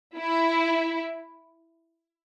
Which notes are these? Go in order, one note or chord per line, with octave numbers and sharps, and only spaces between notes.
E4